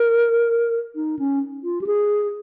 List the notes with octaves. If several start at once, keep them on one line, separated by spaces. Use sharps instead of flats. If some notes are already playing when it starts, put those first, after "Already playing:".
Already playing: A#4
D#4
C#4
F4
G4
G#4